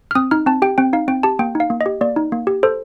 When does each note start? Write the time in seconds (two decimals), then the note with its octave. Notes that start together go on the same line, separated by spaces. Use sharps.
0.11 F6
0.15 C4 D#6
0.31 D#4 F6
0.46 C4 A5
0.62 G4 G5
0.78 C4 G5
0.93 D#4 F5
1.08 C4 G5
1.23 G4 A5
1.39 A#3 G5
1.55 D#4
1.60 F5
1.70 A#3
1.81 D#5
1.86 G4
2.01 A#3 D5
2.16 D#4
2.32 A#3
2.47 G4
2.63 A4 C5